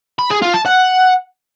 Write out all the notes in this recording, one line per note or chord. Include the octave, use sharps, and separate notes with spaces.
B5
G#4
F4
A5
F#5